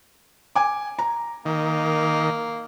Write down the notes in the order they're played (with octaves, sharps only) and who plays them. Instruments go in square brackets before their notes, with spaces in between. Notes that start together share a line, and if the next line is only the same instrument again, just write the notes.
[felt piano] G#5 D6
A#5
[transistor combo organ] D#3 [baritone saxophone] A#3